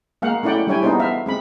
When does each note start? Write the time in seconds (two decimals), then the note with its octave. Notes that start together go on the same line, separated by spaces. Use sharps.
0.22 G#3 A#3 F5 F#5
0.43 A3 C#4 E4 D5 F#5 G5
0.67 G3 D4 E4 C#5 G5 G#5
0.83 B3 D4 D#4 G#4 C5
0.99 B3 E5 F5
1.26 G#3 C4 B5